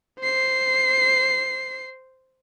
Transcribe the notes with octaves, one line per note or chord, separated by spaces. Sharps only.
C5 C7